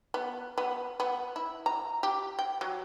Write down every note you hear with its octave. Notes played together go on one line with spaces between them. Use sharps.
B3
B3
B3
E4
A#5
G4
G5
F#3